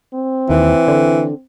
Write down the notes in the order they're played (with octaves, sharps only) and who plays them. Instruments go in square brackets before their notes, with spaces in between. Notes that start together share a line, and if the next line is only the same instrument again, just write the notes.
[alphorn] C4
[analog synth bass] D#2 [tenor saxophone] E3
[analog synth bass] D3